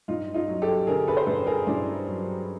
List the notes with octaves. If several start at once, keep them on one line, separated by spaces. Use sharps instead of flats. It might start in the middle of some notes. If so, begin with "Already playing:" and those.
G2 D#4 F4
D#4 F4
F#3
G4 A4
D3 G#4 A#4
A4 B4
C5
G2 A4 B4
G#4 A#4
G2 D4 E4
F#3